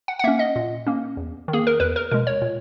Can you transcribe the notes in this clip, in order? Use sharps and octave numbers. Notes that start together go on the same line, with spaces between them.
F#5
F#5
A#3 C#4 E5
D#5
A#2
A#3 C#4
E2
D#3
A#3 G#4
A#4
E2 B4
A#4
B2 G#3 A#4
C#5
A#2